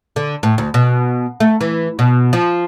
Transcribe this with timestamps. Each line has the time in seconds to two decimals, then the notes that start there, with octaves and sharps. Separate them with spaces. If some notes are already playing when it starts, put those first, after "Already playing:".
0.16 D3
0.43 A2
0.58 D2
0.74 B2
1.40 A3
1.61 E3
1.99 B2
2.33 F3